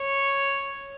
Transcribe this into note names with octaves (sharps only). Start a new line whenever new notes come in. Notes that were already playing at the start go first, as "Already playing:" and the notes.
Already playing: C#5